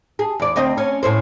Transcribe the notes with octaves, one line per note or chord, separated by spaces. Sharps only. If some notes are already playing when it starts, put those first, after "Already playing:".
G#4
E2 D5
D2 C4 D#5
C#4
A2 C#4 C5